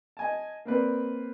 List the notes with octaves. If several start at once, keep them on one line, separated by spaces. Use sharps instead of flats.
D#5 G#5 A5
A#3 C4 B4 D5